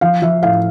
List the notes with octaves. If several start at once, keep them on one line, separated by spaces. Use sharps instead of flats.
F3 F5
F3 E5
A2 F5